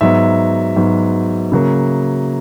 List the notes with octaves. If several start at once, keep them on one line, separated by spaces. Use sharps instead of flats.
G#2 F#3 B3 E5
G#2 F#3 B3
C#3 F#3 A#3